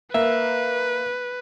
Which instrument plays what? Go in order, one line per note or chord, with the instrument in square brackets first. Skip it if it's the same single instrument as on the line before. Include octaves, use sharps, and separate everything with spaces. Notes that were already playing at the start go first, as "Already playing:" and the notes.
[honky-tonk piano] A#3 [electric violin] B4 [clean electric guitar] E5